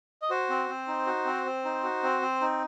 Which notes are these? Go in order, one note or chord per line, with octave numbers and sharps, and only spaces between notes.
D#5
F#4 C5
C4
C4
D#4
F#4
C4
C4
D#4
F#4
C4
C4
D#4